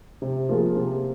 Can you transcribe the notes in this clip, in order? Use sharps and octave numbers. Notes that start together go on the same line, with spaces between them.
C3
F3 A#3 F4 G#4
C3